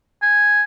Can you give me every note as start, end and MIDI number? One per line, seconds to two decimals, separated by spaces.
0.22 0.63 80